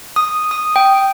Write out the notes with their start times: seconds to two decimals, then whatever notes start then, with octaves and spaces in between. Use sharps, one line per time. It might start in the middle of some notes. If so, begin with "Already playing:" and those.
0.16 D#6
0.51 D#6
0.76 G5